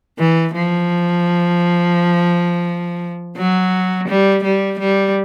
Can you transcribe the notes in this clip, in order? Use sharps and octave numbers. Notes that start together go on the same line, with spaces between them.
E3
F3
F#3
G3
G3
G3